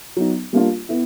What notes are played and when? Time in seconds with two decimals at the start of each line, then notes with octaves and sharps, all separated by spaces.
0.17 F#3 B3 D#4
0.53 G3 A#3 D4 F4
0.89 B3 E4